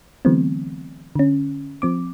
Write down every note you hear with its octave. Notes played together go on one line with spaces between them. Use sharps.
D3 E3 F#3 A3 B3 C4
D3 C#4
F3 C4 D6